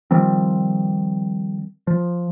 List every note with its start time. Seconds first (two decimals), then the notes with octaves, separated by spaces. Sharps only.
0.11 D#3 F3 G3 C4
1.87 F3